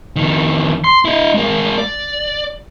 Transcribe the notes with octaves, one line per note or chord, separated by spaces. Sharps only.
F2 D#3
C6
E4 D#5
G#3 A#4
D5